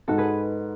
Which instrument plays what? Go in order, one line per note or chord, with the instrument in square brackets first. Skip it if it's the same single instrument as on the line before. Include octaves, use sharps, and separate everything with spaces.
[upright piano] G#2 [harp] F#4 A4
[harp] G#4 B4